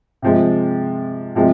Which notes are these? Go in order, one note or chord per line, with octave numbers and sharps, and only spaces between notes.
C3 F3 G#3
C3 F3 G#3